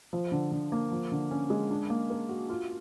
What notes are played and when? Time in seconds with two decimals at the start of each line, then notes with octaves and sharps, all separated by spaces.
0.13 F3
0.32 D3
0.52 D3
0.72 A#3
0.92 F3
1.12 D3
1.31 C#4
1.50 G#3
1.71 D4
1.90 A#3
2.10 A#4
2.29 F#4
2.49 F4